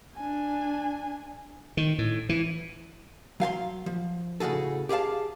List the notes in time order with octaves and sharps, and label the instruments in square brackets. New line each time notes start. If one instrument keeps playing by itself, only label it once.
[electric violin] D4 G#5
[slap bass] D#3
A2
E3
[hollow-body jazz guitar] F#3 F5 G#5 C6
F3
A2 C#3 F#4 G#4 A4
G4 G#4 C5 F5 A5